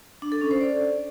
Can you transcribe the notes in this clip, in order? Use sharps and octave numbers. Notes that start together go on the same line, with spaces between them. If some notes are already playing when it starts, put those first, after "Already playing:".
D4
A4
C#4
C5
D5